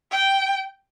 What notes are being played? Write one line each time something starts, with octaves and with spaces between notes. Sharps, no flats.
G5